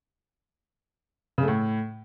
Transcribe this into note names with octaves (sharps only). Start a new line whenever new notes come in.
C#3
A3
A2